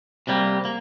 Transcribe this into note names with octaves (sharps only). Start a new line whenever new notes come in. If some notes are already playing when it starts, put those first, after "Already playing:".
C3 G3 A#3
A#3